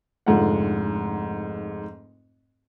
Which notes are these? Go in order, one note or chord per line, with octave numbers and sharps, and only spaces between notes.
F1 G#2 D3 F4 F#5